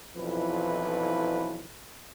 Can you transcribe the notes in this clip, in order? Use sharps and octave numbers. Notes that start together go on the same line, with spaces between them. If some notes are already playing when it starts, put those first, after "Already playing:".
B1 F2 E3 F3 E4 B4